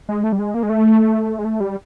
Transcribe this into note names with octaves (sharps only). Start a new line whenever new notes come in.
G#3
A3
G3
G#3
A#3
G#3
A3
G#3
A3
G3